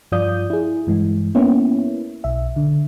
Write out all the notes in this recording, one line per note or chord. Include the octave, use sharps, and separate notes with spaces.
G2 F3 F4 D5 D#6 G6
E4 G#4
G2 E3 G#3
A#3 B3 C#4 E4
B1 E5
D3